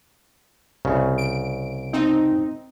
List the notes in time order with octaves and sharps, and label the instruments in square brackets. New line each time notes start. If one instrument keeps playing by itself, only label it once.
[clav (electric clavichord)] C2 C#3
[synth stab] D7
C4 D#4